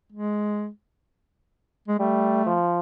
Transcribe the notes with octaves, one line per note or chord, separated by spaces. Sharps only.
G#3
G#3
G3 A3
F3